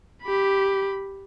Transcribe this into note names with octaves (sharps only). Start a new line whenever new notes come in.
G4 B5